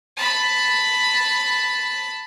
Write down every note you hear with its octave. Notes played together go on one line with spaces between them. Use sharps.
A5 B5